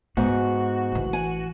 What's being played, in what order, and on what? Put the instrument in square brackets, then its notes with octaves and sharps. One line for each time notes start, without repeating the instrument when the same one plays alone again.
[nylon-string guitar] G#2 [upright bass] G#3 B3 [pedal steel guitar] F#4
[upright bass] A1 E3
[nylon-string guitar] G#5